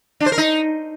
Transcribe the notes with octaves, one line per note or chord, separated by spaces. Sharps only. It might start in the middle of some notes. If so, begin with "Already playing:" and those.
D4
C5
A#4
D#4